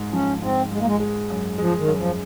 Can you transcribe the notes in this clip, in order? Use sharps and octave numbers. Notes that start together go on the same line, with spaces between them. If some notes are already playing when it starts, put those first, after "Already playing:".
Already playing: G#2
F3 C#4
G#2 C4
G#2 G#3
A#3
G#3
G#3
F#2
F3 G#3
D#3
F#2
F3